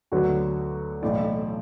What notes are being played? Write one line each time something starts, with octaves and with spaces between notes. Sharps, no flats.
D2 D3 F#3 B3 D4 F#4
B1 A2 E3 D5